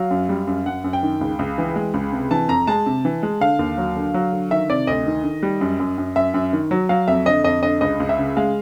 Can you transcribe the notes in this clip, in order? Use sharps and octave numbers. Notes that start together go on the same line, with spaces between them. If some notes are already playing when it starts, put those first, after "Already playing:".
Already playing: F#3 F5
F#2
G3
F#2
F#2 F#5
F#2
G5
D#3
C#2
C#2
E3
G#3
C#2
C3
E3 A5
F2 A#5
G#3 A5
C3
E3
G#3
D3 F5
D#2
F#3
D3
F#3
D3
D#3 E5
C3 D5
D2 D#5
D#3
D#3
G3
F#2
F#2
F#2
F#2 E5
F#2
D#3
F#3
F#3 F5
F2 E5
D3 D#5
F2 D#5
D3 D#5
C#2 D#5
C#2
E5
C#3
G#3 F5